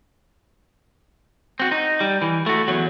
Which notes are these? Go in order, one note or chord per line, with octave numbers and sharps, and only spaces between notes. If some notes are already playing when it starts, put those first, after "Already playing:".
C4 F#4
D#4
G3
E3
A3 F#4
E2 F#3